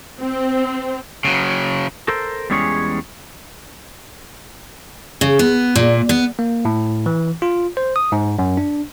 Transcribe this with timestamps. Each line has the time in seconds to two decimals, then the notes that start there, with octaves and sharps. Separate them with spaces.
0.22 C4
1.25 C#3 F#3
2.08 A4 A#4 C5
2.50 E2 G3 G#3 C#4 G#4 C#5
5.21 C#3
5.39 B3
5.76 A#2
6.09 B3
6.39 A#3
6.65 A2
7.06 E3
7.42 F4
7.77 C5
7.96 D#6
8.12 G#2
8.39 F#2
8.57 D4